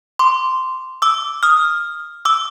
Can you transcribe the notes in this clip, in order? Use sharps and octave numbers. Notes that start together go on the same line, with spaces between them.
C6 D6
D6 E6
D#6 F6
D6 E6